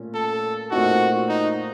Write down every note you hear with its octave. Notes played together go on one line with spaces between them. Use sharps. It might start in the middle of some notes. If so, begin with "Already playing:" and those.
Already playing: A#2 A3 C#4
A4
A#2 A3 C4 D#4 F#4
D#4